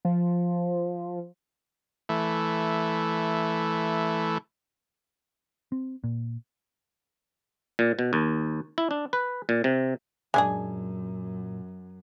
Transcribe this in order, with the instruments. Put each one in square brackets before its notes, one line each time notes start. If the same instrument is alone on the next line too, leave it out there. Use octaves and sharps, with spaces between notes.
[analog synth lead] F3
[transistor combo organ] E3 A3
[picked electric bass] C4
A#2
[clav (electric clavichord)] A#2
B2
D#2
E4
D4
B4
A#2
C3
[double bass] F#2 [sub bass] A#2 [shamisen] G#3 D4 G#4 [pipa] G#5